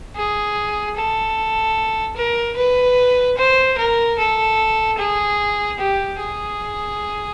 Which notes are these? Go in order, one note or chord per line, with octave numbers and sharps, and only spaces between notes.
G#4
A4
A#4
B4
C5
A#4
A4
G#4
G4
G#4